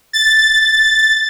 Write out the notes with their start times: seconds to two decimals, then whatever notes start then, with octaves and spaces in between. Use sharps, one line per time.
0.13 A6